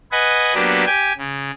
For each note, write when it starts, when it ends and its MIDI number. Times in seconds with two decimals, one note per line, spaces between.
0.12 0.54 71
0.12 0.54 75
0.12 0.54 78
0.12 0.54 80
0.55 0.85 54
0.55 0.85 58
0.55 0.85 59
0.55 0.85 62
0.55 0.85 67
0.87 1.13 67
0.87 1.13 79
0.87 1.13 80
1.18 1.51 49